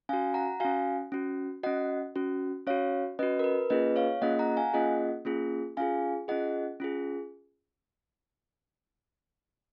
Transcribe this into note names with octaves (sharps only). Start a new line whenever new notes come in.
C#4 F#4 F5 G#5
F#5 A#5
C#4 F#4 F5 G#5
C#4 F#4
C#4 F#4 D#5 F#5
C#4 F#4
C#4 F#4 C#5 F5
C#4 F#4 B4 D#5
A#4
B4
A#3 C#4 F4 G#4 B4 D#5
C#5 F5
A#3 C#4 F4 G#4 D#5 F#5
F#5 A#5
F5 G#5
A#3 C#4 F4 G#4 D#5 F#5
A#3 C#4 F4 G#4
C#4 F4 G#4 F5 G#5
C#4 F4 G#4 D#5 F#5
C#4 F4 G#4